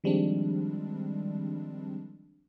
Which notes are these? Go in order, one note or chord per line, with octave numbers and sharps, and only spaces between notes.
D#3 F3 G3 G#3 C4 D4